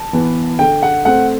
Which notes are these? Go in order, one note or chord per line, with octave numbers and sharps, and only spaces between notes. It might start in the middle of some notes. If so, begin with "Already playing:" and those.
Already playing: A5
E3 B3
D3 G5
F#5
A3 C4 F#5